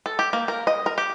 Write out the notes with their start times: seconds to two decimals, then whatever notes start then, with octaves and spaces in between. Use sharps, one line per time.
0.06 A4
0.19 G4
0.33 A#3
0.48 A#4
0.67 D#5
0.86 A#4
0.98 G4